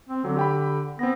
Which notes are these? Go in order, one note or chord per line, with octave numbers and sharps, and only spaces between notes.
C4
D3 F#3
G4 G5 B5
B3 C4 A#6